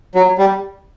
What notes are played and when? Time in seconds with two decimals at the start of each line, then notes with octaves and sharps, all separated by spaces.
0.15 F#3
0.38 G3